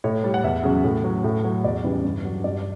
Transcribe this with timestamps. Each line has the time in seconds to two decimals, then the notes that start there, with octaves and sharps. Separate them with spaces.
0.04 A2 C#5
0.24 G3
0.34 F#5
0.44 E2 E5
0.64 C#3 F#3
0.84 A2
1.04 F#3
1.24 A2
1.44 F#3
1.64 E2 D5
1.84 C#3 E3 G3
2.04 G2
2.25 F#3
2.44 G2 D5